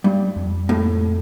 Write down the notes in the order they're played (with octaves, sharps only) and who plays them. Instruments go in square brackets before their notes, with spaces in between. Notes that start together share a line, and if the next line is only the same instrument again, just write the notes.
[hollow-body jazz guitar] G2
[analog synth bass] F2
[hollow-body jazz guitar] A2